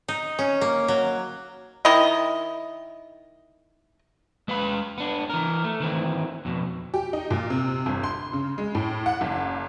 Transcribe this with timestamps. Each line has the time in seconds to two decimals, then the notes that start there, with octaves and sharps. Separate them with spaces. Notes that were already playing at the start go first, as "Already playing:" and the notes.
0.08 D#4
0.39 C#4
0.61 A#3
0.88 F#3
1.85 D#3 E4 D#5
4.48 G#3 B4 F5 B5
4.98 B3 D4
5.30 E3 A#4
5.64 A3
5.80 D#3 E3 C4
6.45 F2 B2
6.94 G4
7.13 D#4
7.31 A#2
7.50 C3
7.86 G1
8.04 C6
8.33 C#3
8.58 G#3
8.75 A2
9.06 F#5
9.21 F#1